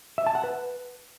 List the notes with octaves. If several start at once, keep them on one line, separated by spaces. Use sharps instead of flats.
E5
A5
F#5
B4